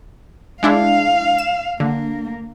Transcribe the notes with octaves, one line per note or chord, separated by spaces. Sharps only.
G#3 D4 E4 F5
E7
D3 A#3